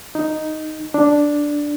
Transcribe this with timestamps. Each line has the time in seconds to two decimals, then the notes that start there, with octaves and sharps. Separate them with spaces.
0.15 D#4
0.94 D4